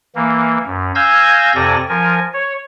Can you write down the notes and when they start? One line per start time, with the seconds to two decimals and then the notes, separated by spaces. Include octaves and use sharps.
0.15 E3 A#3
0.66 F#2
0.95 F5 G#5 E6 G6 G#6 A#6
1.55 F2 C3 A4 D5 G#5 A#6
1.89 F3 A#4 G#5
2.33 C#5